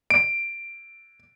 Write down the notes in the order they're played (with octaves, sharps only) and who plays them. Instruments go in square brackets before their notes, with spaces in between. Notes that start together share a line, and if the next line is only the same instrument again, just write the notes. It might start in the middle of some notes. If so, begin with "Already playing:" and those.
[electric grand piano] D7